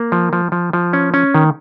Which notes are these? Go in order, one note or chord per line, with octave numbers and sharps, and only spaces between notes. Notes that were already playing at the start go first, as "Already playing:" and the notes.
Already playing: A#3
F3
F3
F3
F3
C#4
C#4
D#3